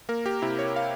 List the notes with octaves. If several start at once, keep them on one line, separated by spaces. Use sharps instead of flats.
A#3 A#4
G4
C3 E4
C#5
F5